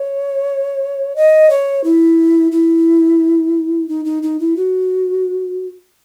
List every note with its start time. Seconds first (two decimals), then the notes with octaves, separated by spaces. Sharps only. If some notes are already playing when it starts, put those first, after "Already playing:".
Already playing: C#5
1.16 D#5
1.50 C#5
1.84 E4
2.52 E4
3.88 D#4
4.05 D#4
4.23 D#4
4.40 E4
4.56 F#4